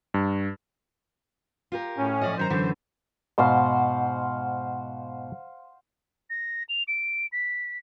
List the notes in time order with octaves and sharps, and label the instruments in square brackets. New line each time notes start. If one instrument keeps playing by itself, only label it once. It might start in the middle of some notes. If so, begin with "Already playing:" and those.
[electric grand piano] G2
[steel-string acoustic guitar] F4 G4 A#4
[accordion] A2 C#4
[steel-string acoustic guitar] F3 D5 D#5
[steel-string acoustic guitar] F#2 D#3 A#5 [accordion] C5
[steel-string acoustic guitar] F#2 D3 E3
[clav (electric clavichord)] G#2 B2 [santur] C5 F5 F#5
[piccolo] A#6
F7
D7
B6